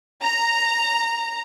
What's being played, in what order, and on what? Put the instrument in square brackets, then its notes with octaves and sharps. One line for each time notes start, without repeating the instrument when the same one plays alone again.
[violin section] A#5